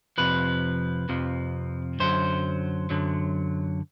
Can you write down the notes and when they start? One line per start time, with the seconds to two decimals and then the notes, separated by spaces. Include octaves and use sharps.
0.18 F2 C3 F3 B4
1.09 F2 C3 F3
2.00 F#2 D3 F#3 C5
2.90 F#2 D3 F#3